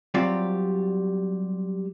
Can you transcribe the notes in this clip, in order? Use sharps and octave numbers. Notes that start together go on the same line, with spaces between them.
F#3 G3 C4 F4 G4 D5